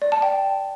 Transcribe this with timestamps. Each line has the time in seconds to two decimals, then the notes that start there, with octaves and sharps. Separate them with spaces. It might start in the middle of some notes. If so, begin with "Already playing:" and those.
0.02 D5
0.12 A5
0.22 G5